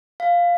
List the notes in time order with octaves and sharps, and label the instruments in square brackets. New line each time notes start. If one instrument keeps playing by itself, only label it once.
[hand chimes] F5